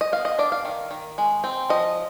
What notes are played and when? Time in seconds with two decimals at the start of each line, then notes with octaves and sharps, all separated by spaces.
0.01 D#5
0.12 B3 F5
0.25 D#5
0.38 D4 D5
0.52 F5
0.65 D#3
0.91 D#3
1.18 G#3
1.44 C4
1.70 F3 D#5